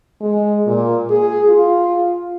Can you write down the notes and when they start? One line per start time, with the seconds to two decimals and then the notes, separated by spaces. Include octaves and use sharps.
0.21 G#3
0.66 A#2
1.10 G#4
1.48 F4